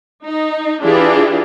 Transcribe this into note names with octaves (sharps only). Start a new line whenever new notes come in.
D#4
E3 D4 E4 F4 G4 G#4